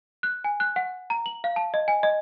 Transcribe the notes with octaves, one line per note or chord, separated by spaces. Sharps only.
F#6
G#5
F#6
F#5
A#5
F#7
F5
A5
D#5
G#5
D#5